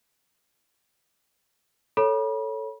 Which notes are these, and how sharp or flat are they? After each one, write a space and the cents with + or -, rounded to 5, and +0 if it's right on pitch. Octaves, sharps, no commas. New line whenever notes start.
A4 +0 C#5 +0 B5 -35